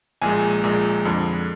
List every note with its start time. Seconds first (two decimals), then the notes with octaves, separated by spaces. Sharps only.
0.22 A#1 A#2 G#3 G#5
0.63 A#1 A#2 G#3
1.05 F2 D3 G#3